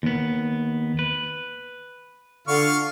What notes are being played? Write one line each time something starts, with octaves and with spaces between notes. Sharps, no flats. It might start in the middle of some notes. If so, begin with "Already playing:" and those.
D#2 B3
B4
D3 F4 C#6 F6